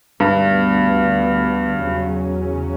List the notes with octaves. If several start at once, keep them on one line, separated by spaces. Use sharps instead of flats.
D2 G2 D3 G3 B3
E2 C#3 F#3 C#4